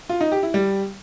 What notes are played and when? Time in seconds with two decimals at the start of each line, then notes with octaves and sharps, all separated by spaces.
0.09 F4
0.21 D#4
0.32 G4
0.43 E4
0.54 G3